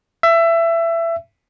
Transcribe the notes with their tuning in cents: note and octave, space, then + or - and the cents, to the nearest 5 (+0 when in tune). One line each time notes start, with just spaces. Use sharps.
E5 +20